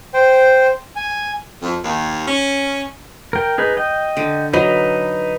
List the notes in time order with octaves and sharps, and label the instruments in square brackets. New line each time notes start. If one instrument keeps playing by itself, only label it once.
[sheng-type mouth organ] C5 G5
G#5
[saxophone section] F2
D#2
C#4
[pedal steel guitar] A#4 G5
D#4 G#4 B4
D#5 G5
[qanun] D3
[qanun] F#3 [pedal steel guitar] D#4 B4 D#5